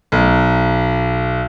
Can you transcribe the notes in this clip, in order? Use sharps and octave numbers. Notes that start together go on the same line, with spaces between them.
B1